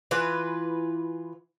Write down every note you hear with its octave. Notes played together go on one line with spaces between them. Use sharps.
E3 F4 B4